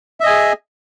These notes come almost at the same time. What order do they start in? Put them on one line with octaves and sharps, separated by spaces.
E5 D#5 G#5 G#4